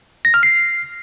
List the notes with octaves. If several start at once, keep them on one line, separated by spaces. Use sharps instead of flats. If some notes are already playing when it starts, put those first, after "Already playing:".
A#6
F6
C7